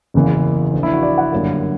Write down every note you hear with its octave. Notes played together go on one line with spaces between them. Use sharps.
F#1 E2 C#3 E3 A#3
A#1 A#2 A#3
E4
F#4
D5
F#5
G1 F#2 D3 G3 A#3